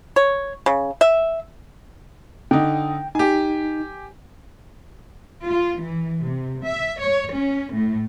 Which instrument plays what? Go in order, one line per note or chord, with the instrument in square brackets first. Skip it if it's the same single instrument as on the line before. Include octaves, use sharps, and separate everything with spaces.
[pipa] C#5
C#3
E5
[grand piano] D3 D#4 [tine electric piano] G5
[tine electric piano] D#4 [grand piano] G4 G#5
[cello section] F4
E3
C3
E5
C#5
C#4
A2